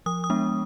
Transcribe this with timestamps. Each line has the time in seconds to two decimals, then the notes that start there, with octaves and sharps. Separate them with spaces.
0.06 F3 D#6
0.24 D#6
0.30 G#3 B3 D4